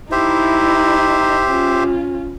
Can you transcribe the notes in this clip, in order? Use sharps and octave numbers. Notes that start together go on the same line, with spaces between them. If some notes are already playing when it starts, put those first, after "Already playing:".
D#4 E4 G4 C5 E5
C#4 F4